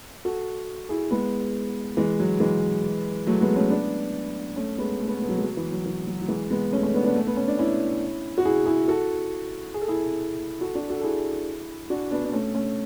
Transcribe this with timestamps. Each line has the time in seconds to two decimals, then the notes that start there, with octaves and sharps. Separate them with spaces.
0.25 F#4 A4
0.89 E4 G#4
1.11 G#3 B3
1.97 E3 G#3
2.20 F#3
2.40 E3 G#3
3.27 F#3 A3
3.41 G#3 B3
3.56 A3 C#4
3.70 B3 D4
4.56 A3 C#4
4.78 G#3 B3
5.00 A3
5.07 B3
5.15 A3
5.22 B3
5.28 F#3 A3
5.38 G#3
5.42 F#3
5.57 E3
5.72 F#3
5.86 E3
6.07 F#3
6.22 F#3
6.28 E3 G#3
6.51 G#3 B3
6.73 A3 C#4
6.83 A3 C#4
6.94 B3 D4
7.04 B3 D4
7.15 A3
7.27 B3
7.37 C#4
7.48 D4
7.59 C#4 E4
8.38 F#4
8.45 E4 G#4
8.66 E4 G#4
8.88 F#4 A4
9.74 G#4
9.82 A4
9.88 E4 G#4
10.61 F#4 A4
10.75 D4 F#4
10.89 F#4 A4
10.99 A4
11.03 E4 G#4
11.90 D4 F#4
12.11 B3 D4
12.25 D4
12.32 A3 C#4
12.55 A3 C#4